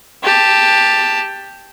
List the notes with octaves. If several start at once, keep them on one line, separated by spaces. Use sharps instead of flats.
G4 A5